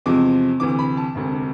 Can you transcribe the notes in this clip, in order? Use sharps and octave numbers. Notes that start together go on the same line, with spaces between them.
E2 C3 F3 G#3 C4 D6
D2 C3 E3 D6
B5
A5
E1 D2 C3